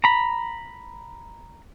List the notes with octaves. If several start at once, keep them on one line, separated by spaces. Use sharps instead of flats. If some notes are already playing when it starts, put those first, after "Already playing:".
A#5 B5